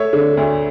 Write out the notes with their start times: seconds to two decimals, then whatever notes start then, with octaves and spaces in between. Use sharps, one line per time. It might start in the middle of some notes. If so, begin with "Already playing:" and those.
Already playing: A3 C#5 E5
0.13 D3
0.37 D2